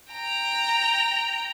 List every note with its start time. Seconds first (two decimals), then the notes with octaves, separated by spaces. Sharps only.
0.13 G5 A#5